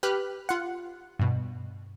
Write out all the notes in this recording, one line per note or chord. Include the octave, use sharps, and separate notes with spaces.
G4 B4 B5 F6 F#6
F4 F#5
G2 B2